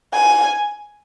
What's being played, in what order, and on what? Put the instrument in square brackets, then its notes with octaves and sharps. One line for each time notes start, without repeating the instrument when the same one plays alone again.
[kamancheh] G#5